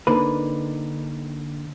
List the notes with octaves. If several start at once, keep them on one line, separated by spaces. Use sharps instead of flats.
D3 A#3 C4 D#4 B4